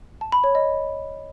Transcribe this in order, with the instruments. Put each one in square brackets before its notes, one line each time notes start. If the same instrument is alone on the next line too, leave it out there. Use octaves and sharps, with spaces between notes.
[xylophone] A5
B5
C#5
D#5